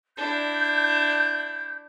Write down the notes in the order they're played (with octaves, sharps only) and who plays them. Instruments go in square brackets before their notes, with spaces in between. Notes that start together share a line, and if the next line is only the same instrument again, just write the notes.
[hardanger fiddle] D4 E4 [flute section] G6